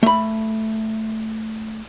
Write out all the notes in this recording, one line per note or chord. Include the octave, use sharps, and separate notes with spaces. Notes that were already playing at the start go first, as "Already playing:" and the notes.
A3 B5